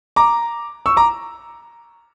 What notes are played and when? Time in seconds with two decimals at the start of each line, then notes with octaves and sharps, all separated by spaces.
0.16 A#5 D6
0.86 C#6 E6
0.97 A#5 D6